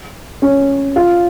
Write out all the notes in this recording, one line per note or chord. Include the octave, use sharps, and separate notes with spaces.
C#4
F4